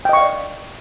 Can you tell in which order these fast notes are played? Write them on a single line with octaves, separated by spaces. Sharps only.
G5 D#5 C#6 F5 D5